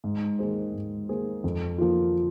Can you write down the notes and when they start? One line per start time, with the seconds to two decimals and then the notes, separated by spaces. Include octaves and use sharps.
0.04 G#2
0.39 D#3 A#3 G#4 C5
0.74 G#2
1.09 D#3 A#3 G#4 C5
1.44 F2
1.78 F3 A#3 F4